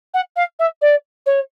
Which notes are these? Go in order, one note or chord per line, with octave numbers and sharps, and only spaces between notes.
F#5
F5
E5
D5
C#5